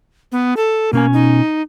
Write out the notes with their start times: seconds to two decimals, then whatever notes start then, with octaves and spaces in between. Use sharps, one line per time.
0.32 B3
0.57 A4
0.93 B2 A#3 C#4 G#5
1.13 D#4